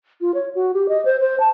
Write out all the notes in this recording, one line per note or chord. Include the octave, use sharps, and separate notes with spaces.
F4
C#5
F#4
G4
D#5
C5
C5
A5